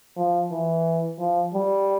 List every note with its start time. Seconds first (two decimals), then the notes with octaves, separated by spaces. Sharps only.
0.17 F3
0.51 E3
1.19 F3
1.54 G3